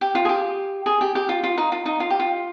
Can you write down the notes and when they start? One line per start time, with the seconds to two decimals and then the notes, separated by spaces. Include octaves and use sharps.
0.01 G4
0.15 F4
0.25 G#4
0.29 G4
0.86 G#4
1.01 G4
1.15 G4
1.29 F4
1.44 F4
1.58 D#4
1.72 F4
1.86 D#4
2.00 F4
2.10 G4
2.20 F4